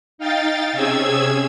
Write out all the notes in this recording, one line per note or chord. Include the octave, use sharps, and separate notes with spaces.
D#4 F5 G5 A6
C3 C#4 G#4 E6 G#6